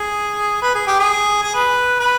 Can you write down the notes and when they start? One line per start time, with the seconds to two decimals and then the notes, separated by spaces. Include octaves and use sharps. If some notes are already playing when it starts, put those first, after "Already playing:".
Already playing: G#4
0.62 B4
0.75 G#4
0.87 G4
0.99 G#4
1.43 G#4
1.54 B4
2.00 B4